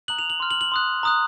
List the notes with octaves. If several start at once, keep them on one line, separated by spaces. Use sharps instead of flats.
A#5 D#6 F#6 F#7
F7
F#7
C6 F6
F#7
F#7
C6 D#6 F#6
A#5 D#6 F#6